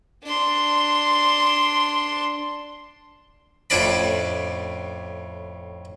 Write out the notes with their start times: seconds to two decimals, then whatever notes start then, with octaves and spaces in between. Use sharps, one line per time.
0.25 D4 C6
3.70 F2 A2 C#4 D4 D5 B5